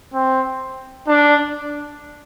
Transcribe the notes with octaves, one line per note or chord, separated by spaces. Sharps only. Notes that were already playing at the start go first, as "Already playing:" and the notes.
C4
D4